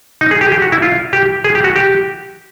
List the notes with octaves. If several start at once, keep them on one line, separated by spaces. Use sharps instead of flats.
D#4
G#4
G4
G#4
G4
F#4
E4
F4
G4
G#4
G4
F#4
G4